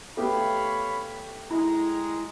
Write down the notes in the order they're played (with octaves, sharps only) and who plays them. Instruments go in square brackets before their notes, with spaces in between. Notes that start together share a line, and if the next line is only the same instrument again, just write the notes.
[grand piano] A3 B3 G4 [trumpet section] C#5 F5 B5
[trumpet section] G#3 A#5 [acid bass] E4